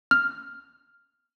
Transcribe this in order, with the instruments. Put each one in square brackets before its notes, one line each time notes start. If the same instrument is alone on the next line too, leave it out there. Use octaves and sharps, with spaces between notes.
[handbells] F6